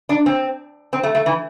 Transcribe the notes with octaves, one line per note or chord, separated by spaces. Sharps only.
D4
C4
C4
A3
A3
E3